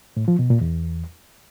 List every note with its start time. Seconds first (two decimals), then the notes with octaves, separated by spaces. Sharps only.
0.17 A2
0.28 F3
0.39 B2
0.50 A#2
0.61 E2